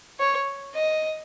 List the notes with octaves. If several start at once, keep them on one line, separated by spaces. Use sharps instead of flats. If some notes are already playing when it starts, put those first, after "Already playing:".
C#5
D#5